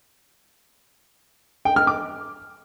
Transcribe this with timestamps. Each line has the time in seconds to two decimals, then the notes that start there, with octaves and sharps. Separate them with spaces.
1.65 G5
1.76 F6
1.87 D6